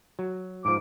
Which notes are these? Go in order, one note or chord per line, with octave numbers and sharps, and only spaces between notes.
F#3
G#2 F3 D6